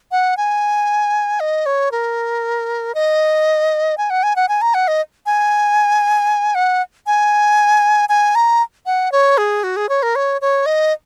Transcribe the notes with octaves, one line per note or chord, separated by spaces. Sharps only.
F#5
G#5
D#5
C#5
A#4
D#5
G#5
F#5
G#5
F#5
G#5
A#5
F#5
D#5
G#5
F#5
G#5
G#5
A#5
F#5
C#5
G#4
F#4
G#4
C#5
A#4
C#5
C#5
D#5